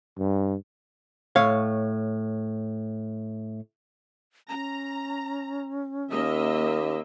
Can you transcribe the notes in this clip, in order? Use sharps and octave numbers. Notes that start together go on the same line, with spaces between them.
G2
A2 C#5 F5
C#4 A#5
D#2 A#3 D#5 E5